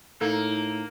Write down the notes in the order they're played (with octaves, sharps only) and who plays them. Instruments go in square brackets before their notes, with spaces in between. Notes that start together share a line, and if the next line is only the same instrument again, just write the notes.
[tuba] A2 [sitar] A#3 [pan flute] D#4 [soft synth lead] A4